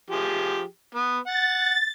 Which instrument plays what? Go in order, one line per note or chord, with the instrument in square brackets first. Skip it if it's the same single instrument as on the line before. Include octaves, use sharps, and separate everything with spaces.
[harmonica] F3 G4 G#4
B3
[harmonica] F#5 [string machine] A6